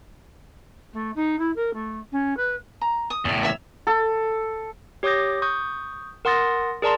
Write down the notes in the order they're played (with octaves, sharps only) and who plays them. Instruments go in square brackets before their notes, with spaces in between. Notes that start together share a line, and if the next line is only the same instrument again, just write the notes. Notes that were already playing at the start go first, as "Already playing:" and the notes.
[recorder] A3
D#4
E4
A#4
A3
C#4
B4
[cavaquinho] A#5
D#6
[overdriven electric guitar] E2 A2
[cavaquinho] C#5 E5 B5
[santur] A4
[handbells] G4 C#5 D6 D#6 G6 A#6
C#6 D#6 G6
A#4 F#5 C6 D#6 A6 A#6
G#4 A#4 D5 A5 A#5 C6